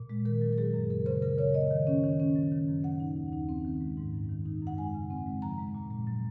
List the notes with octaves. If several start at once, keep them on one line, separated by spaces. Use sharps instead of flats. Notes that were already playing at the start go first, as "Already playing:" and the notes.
Already playing: A#2
G#3
D#3 A#4
F#3
A#4
F#3 G#4
F#2
C#3 A#4
C#3 C5
C#3 A#4
C#3 C#5
A#3 D#5
D#3
C#4
D#3
C#4
F#3
D#3
F#2
A#3 F#5
D#4
D#2
D#4
C4
D#3
G#3
G#2
F#2
D#3
D#4
F#2
F#5
G#3 G#5
C#3
C4
G#3
F3 A#5
G#3
A#2
G#3
F#3